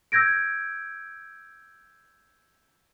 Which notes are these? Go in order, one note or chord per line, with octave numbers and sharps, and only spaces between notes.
E6 G6 G#6 A#6 D7